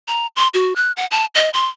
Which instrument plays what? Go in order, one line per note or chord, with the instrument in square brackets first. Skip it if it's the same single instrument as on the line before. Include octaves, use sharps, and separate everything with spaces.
[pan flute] A#5
C6
F#4
F#6
F#5
A5
D#5
C6